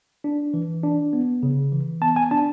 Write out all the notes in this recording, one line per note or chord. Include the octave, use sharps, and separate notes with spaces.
D4
E3
D4
B3
C#3
E3
B3 A5
G#5
D4 A5